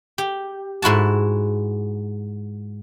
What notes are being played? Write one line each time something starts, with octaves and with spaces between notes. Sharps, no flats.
G4
G#2 E4 F#4 A5